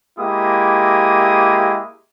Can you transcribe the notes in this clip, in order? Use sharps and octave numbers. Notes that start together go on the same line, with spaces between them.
G#3 A#3 E4 G4 D#6